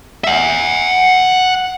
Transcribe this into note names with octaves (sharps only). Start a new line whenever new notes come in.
E5 F#5